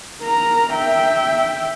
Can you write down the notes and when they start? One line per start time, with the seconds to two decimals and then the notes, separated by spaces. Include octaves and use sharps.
0.21 A#4 A#5
0.73 E5 G5